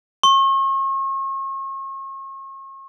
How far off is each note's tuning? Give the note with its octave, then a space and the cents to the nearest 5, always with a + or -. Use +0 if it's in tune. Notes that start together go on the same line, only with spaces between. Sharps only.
C#6 -40